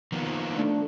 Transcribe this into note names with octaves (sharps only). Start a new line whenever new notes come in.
D#3 F3 A#3 B3
A3 D4